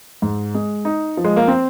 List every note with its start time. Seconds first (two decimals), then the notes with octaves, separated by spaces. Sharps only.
0.22 G#2
0.54 G#3
0.85 D#4
1.17 F3
1.24 G#3
1.36 A#3
1.48 C4